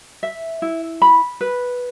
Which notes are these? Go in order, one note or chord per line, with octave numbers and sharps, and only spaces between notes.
E5
E4
B5
B4